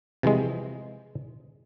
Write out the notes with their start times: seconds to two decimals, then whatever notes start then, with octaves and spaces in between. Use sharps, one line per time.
0.23 C3 E3 F3 G#3